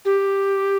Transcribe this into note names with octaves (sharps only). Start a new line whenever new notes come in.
G4